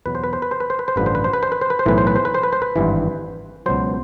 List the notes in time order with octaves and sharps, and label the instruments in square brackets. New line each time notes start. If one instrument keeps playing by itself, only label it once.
[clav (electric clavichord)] E2 B2 F#3 B4
C5
B4
C5
B4
C5
B4
C5
B4
C5
A1 G2 D3 F3 B4
C5
B4
C5
B4
C5
B4
C5
B4
C5
B1 A2 E3 B4
C5
B4
C5
B4
C5
B4
C5
B4
G#1 G2 E3
C#2 B2 F#3 C5